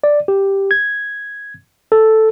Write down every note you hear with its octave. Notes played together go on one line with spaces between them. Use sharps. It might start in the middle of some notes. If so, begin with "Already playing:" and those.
D5
G4
G#6
A4